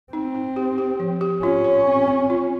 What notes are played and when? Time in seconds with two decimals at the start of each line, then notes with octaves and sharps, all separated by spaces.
0.13 C4 D#4
0.35 D#4
0.56 G4
0.78 G4
1.00 F3
1.21 G4
1.43 C#4 F4
1.65 C#5
1.87 C4
2.08 C4
2.30 F4